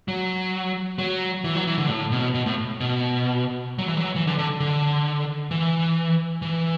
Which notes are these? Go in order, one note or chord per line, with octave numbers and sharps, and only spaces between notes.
F#3
F#3
E3
F#3
E3
D3
A2
B2
B2
A2
B2
F#3
E3
F#3
E3
D3
D3
D3
E3
E3